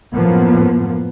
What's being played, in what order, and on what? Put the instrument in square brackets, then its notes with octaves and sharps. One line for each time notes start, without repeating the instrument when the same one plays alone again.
[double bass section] F#2 A2 F3 A#3 B3